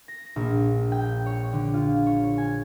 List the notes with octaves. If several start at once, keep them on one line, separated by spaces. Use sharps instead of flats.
A#6
A#1
G5
C#5
D3
F4
C#5
G#5